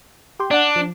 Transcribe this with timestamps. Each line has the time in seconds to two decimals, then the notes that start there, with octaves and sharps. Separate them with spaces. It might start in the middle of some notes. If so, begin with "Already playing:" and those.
0.40 G4 G5 C6
0.51 D4 D5 F#5
0.76 F3